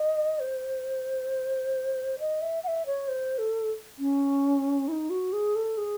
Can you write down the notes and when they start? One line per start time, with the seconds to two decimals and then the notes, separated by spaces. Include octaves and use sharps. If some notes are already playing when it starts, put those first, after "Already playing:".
Already playing: D#5
0.40 C5
2.19 D#5
2.42 E5
2.64 F#5
2.68 E5
2.86 C#5
3.08 C5
3.38 A4
3.98 C#4
4.88 E4
4.92 D#4
5.10 F#4
5.33 G#4
5.56 A4
5.78 G#4